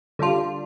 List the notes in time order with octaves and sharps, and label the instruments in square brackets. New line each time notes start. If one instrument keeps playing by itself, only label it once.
[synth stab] D3 G3 D4 F4